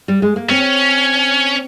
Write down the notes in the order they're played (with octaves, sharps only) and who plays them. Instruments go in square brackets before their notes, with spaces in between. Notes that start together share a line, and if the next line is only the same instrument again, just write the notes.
[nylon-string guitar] G3
G#3
A#3
[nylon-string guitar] C4 [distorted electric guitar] C#4